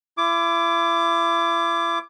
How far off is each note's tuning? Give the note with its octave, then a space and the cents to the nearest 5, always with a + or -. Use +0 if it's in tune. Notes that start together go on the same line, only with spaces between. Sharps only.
E4 +35 D6 +0